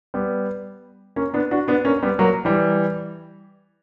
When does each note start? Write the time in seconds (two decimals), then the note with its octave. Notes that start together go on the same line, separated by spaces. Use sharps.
0.14 G3 B3
1.16 A#3 C#4
1.34 B3 D4
1.51 D4 F#4
1.68 B3 D4
1.85 A#3 C#4
2.03 G3 B3
2.19 F#3 A#3
2.45 E3 G3